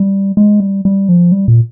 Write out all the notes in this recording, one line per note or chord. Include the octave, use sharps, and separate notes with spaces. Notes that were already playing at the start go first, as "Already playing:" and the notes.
Already playing: G3
G#3
G3
G3
F3
G3
A#2